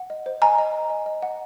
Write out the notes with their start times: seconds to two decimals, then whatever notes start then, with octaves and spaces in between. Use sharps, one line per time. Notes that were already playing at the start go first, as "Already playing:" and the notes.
Already playing: F#5
0.10 D#5
0.26 C5
0.42 D#5 G#5 A#5
0.58 D#5
0.74 D#5
0.90 D#5
1.06 D#5
1.22 F#5